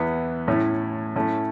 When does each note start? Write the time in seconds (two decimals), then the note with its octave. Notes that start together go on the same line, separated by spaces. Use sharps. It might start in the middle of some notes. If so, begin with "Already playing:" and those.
Already playing: E2 E3 B3 E4
0.48 A2 A3 C#4 E4
1.16 A2 A3 C#4 E4